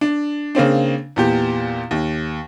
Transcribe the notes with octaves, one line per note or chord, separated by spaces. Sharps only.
D4
C#3 A#3 C4 D4
E2 A#2 G4
D#2